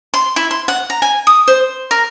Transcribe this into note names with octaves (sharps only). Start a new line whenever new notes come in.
C6
E4
C6
F#5
A#5
G#5
D#6
C5
A#4